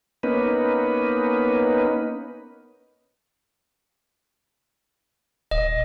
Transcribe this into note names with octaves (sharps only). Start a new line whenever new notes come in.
A#3 B3 C#4 D#4 B4
D#1 D#5